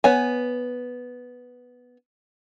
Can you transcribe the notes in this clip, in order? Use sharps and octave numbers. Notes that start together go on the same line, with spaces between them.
B3 C#5 G#5